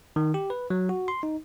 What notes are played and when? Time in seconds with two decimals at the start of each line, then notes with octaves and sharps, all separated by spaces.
0.16 D#3
0.34 G4
0.50 B4
0.70 F#3
0.89 F#4
1.08 C6
1.23 D#4